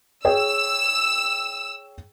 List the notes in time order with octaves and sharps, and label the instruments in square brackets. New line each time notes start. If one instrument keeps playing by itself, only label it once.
[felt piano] G#4 C#5 G5 [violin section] E6